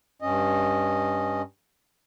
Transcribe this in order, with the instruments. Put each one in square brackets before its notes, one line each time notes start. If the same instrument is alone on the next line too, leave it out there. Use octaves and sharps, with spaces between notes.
[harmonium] G2 C#4 D#5